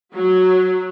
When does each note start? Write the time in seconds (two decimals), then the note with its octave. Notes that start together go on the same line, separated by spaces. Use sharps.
0.14 F#3